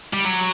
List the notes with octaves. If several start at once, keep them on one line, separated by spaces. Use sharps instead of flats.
G3
F#3